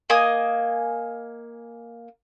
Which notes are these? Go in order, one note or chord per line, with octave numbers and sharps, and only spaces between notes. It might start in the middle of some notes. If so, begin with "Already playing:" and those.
A#3 D#5 G#5 D#6